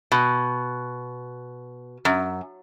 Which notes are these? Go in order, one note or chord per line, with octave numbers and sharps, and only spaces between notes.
B2
F#2